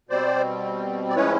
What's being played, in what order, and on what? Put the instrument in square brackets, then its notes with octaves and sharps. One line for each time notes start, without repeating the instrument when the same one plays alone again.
[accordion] B2 G3 C4 C5 D5
D5
A2 F3 G#3 C#4 E4 B4 C#5